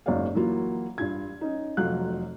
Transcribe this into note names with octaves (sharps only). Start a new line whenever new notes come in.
F#1 G#2 F#4 C#5 D5 F5
E3 F#3 A#3 F4 F#4
G2 F4 G#6
C#4 D#4
F1 F2 F#3 F4 F5 F#6